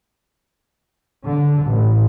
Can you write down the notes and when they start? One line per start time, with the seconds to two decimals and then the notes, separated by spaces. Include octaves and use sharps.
1.26 D3
1.66 A1